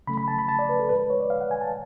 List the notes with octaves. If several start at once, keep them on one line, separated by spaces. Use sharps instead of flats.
C#3 F#3 A3 B5
B5
A5
B5
A5
D5
B4
A4
A2 G#3 B4
B4
C#5
D5
F5
F#5
G#5
A5